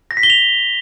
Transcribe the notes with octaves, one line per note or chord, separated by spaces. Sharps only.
A#6
B6
G7
F7